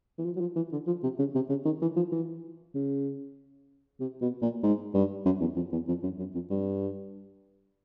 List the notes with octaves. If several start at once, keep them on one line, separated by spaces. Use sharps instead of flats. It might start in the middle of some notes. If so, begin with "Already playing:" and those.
E3
F3
F#3
F3
E3
D3
F3
C3
C#3
C3
C#3
D#3
E3
F3
E3
C#3
C3
B2
A#2
G#2
G2
F#2
E2
F2
E2
F2
F#2
F#2
F2
G2